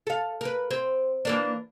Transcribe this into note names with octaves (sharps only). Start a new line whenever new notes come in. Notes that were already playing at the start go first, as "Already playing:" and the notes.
A4 F5
A#4 B4
C4
E3 A#3 D4